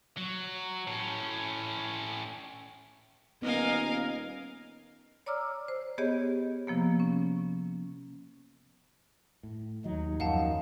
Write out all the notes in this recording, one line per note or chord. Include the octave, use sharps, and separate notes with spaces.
F#3
A2 C#4
D#1 B3 A#4 D#5 F5 G#5
C#5 D5 A#5 D6 E6 F6
C5
B3 G4 G#4 C#5 D#5
C3 F3 A#3 B3
C#4
A2
D#2 F#3 D#4
F#2 F3 F5 F#5 A5